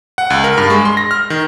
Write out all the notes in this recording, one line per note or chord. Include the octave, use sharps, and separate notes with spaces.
F#5
C#2
A#4
G2
G#3
C6
A#6
F6
D#3